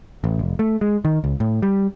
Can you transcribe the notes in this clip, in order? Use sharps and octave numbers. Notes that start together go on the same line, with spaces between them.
A1
F1
A3
G#3
D#3
C#2
A2
G3